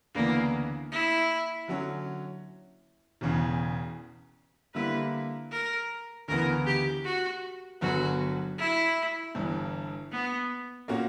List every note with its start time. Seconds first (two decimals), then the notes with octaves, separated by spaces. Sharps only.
0.15 D2 C#3 E3 A#3 B3 D4
0.92 E4
1.68 D3 F#3 C#4
3.21 E1 E2 C#3
4.75 D3 G3 A#3 E4 B4
5.51 A#4
6.28 D2 C#3 E3 B3 A#4
6.66 G4
7.04 F#4
7.81 G1 F#2 D3 F#3 B3 F#4
8.58 E4
9.35 G1 G2 E3
10.12 B3
10.88 A#2 A#3 C#4 F#4